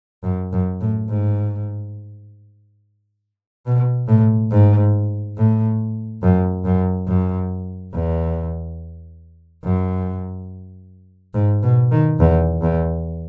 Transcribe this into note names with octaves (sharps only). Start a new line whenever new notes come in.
F#2
F#2
A2
G#2
B2
A2
G#2
A2
F#2
F#2
F#2
E2
F#2
G#2
B2
D#3
E2
E2